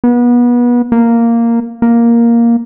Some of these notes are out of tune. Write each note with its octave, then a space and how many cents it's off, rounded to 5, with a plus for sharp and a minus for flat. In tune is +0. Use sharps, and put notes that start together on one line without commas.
B3 -30
A#3 -5
A#3 +5